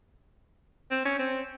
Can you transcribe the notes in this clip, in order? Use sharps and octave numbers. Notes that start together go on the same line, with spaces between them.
C4
C#4
C4